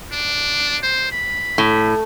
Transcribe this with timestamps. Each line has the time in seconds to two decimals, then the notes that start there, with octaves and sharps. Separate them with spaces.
0.12 D4
0.83 C5
1.12 B5
1.58 A2